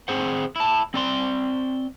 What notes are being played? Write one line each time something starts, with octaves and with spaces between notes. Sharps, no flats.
C4 G#4 C5 F#5
E4 A5
C4 D5 C6